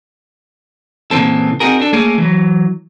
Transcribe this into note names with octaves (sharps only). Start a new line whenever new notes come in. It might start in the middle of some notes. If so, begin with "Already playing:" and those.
A#2 C#3 E3 C4 A4
C4 D#4 F4 F#4 G#4 A#4
D4 A4
A3 A#3 C#4 G#4 A#4
E3 F#3